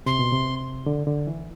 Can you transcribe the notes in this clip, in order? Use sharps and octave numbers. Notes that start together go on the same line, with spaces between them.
C3 C6
B2
C3
D3
D3
E3